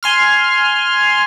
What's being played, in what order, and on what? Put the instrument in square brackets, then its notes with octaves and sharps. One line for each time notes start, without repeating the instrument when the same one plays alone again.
[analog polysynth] G#5 C6 F6